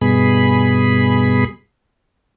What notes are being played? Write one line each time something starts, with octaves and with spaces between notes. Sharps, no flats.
G2 B2 G#4 B5